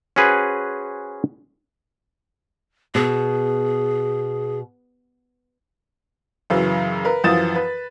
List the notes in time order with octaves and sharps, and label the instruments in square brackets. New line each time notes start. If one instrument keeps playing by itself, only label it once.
[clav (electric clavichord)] C#4 F#4 G#4 B4 C5
[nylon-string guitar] B2 [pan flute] G#4
[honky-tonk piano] F#2 C#3 E3 F#3
A#4 B4
F#2 E3 F3 D#6 A6 E7
B4